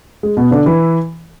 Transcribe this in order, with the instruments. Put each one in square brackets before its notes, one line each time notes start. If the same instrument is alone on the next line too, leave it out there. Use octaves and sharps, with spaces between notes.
[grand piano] G#3
B2 B3
D3 D4
E3 E4